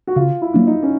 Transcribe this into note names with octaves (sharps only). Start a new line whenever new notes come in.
F#4
C#3 F4
E4
F#3 A#3 D4
D#4
C#4